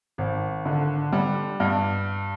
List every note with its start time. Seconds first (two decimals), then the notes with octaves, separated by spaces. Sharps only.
0.18 G#1
0.66 D3
1.12 G3
1.60 G2